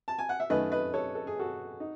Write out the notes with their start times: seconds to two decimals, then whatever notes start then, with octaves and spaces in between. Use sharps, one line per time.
0.08 A5
0.19 G#5
0.29 F#5
0.40 E5
0.50 F#2 D#3 A3 B4 D#5
0.72 B4 D#5
0.94 A4 C#5
1.15 A4
1.27 G#4
1.39 F#4 A4
1.80 D#4